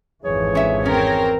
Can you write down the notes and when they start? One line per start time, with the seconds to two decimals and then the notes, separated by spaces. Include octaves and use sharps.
0.24 G#1 F2 E3 G#4 C#5
0.55 C#4 E5 G#5
0.86 C4 C#4 A#4